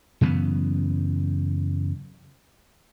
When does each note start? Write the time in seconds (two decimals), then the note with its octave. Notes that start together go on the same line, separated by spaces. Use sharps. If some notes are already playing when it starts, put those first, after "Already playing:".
0.21 F#2 C#3 E3 B3